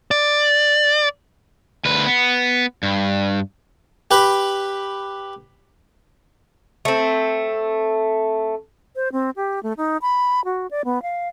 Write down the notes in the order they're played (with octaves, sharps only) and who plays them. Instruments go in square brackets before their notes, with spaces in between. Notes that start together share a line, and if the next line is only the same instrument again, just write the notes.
[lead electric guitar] D5
[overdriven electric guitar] D2 B4
B3
G2
[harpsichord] G4 B4 B5
[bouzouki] A3 C4
[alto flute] C5
C4
G4
A3
D#4
B5
F#4
D5
B3
F5